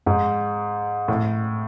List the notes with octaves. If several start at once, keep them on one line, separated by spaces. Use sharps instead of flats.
G#2
A2